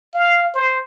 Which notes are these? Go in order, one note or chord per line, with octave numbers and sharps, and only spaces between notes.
F5
C5